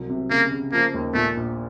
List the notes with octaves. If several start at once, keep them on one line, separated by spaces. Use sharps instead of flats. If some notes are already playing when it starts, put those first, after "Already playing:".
Already playing: C2 F#3
C3
C#3 A#3
C#3
F3 A#3
D#2
A#2 A3
A#1